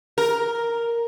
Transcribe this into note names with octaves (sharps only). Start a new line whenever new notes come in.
A#4